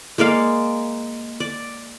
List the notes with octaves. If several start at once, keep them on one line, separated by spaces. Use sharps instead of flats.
G#3 A#3 D5 F5
D5